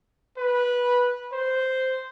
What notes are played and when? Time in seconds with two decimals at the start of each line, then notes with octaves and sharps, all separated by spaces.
0.38 B4
1.32 C5